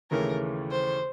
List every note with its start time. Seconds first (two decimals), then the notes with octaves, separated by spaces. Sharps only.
0.11 D#2 C#3 E3 A3 C#4 A#4
0.71 C5